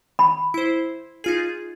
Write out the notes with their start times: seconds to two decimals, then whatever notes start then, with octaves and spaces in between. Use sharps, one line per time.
0.19 B5
0.54 E4 C5
1.24 D#4 F4 G#4